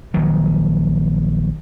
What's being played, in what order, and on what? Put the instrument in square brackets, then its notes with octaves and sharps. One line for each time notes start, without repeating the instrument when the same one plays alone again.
[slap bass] A#1 D#3 F#3